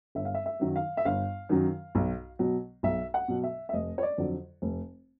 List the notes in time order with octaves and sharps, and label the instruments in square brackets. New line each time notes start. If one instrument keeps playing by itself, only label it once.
[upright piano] G1 E5
F5
E5
E5
F#2 D#3 F#3
F5
E5
G1 F5
F#2 D#3 F#3
B1
B2 F#3
B1 E5
F#5
B2 F#3
E5
E5
F1 D#5
C#5
D5
F2 D3 F#3
F1